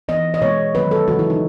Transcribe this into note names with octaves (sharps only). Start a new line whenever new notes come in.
E3 B3 D#5
D#5
B2 G#3 B3 C#5
D#3 F#3 B3 B4
A4
C#3 E3 G#3 F#4
E4
D#4